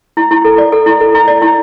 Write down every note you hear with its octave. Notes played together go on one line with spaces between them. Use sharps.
E4
E4
A4
D5
A4
E4
A4
E4
D5
E4